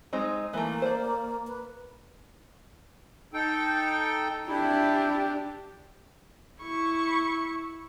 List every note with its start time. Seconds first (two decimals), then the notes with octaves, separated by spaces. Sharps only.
0.13 G#3 C4 D#4
0.53 E3 A3 A#3
0.82 C5 D5
1.47 B4
3.34 D#4 A4 G5
4.48 D4 E4 G4
6.62 E4 C#6